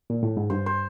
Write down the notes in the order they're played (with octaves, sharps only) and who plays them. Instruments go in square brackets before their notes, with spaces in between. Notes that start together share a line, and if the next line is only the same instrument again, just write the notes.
[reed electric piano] A#2
A2
G#2
[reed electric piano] G2 [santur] C5
[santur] C5